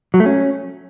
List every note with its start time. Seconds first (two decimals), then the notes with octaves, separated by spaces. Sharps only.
0.14 F#3
0.20 A3
0.26 C#4